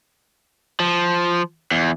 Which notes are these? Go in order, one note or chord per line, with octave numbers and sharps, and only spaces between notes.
F3
E2